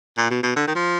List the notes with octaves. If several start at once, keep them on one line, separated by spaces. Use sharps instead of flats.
A#2
B2
B2
D3
D#3
F3